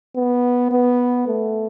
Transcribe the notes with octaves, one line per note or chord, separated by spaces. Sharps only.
B3
B3
A3